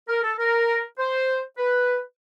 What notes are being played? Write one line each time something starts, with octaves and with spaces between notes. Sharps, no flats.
A#4
A4
A#4
C5
B4